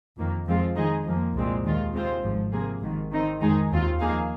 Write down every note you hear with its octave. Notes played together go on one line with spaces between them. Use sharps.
F2 D#3 A#3
F2 F3 G#3 C4 F4
D#3 G#3 D#4 G#4 D#5
F2 F3 A#3
C2 A#2 G#3 C4
D#2 D#3 G#3 F4
C3 G#3 C4 F4 C5
G#1 G#2 F3
C3 F3 A#3 G#4
G#1 G#2 D#3
D#3 C4 D#4
F2 D#3 G#3 D#4 G#4
D#2 D#3 C4 F4
F3 A#3 D#4 G#4 F5